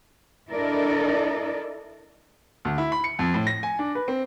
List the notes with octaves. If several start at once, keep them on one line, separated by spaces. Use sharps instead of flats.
D4 E4 A4 A#4 D5 D#5
D2
E4
B5
C#7
F2
A2
A#6
G#5
D4
B4
C4